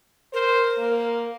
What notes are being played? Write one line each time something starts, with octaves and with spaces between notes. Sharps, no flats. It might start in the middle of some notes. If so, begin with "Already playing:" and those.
A#4 C5
A#3